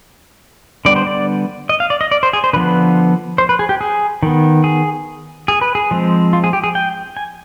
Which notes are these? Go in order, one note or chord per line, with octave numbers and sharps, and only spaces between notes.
D3 G3 B3 D5
C5
D5
D#5
F5
D5
D#5
D5
C5
G#4
C5
D3 F3 B3 B4
C5
B4
G#4
G4
G#4
D#3 B3
G#4
G#4
B4
G#4
F3 G#3 C4
F4
G#4
G4
G#4
G5
G#5